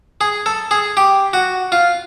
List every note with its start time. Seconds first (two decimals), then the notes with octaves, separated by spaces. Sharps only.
0.21 G#4
0.46 A4
0.71 G#4
0.97 G4
1.33 F#4
1.72 F4